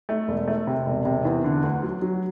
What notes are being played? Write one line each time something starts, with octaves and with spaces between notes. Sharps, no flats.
A3
E1
A3
C3
E1
C3
E2
D3
D2
F#3
F#3